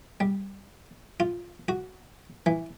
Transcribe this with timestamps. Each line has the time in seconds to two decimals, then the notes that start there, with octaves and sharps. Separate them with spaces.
0.20 G3
1.20 F4
1.68 F#4
2.46 E3